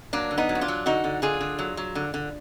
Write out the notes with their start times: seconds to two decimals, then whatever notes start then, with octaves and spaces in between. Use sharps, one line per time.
0.13 F#3 A#3 D4
0.31 D3
0.38 B3 D#4
0.49 F#3
0.55 F#4
0.61 D4 F4
0.68 F#3
0.86 D3 D#4 F#4
1.04 D3
1.22 D3 F4 G#4
1.41 D3
1.59 F#3
1.77 F#3
1.95 D3
2.14 D3